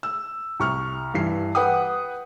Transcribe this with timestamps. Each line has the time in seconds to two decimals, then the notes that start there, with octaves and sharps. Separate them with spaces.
0.03 E6
0.60 C2 C#6 F6
1.14 G2 E3 C7
1.55 B4 F#5 G5 D#6